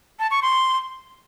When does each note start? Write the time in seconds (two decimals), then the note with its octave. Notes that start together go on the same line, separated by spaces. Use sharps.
0.19 A5
0.31 C#6
0.42 C6